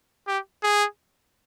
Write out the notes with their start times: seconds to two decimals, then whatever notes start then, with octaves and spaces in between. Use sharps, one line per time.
0.28 G4
0.63 G#4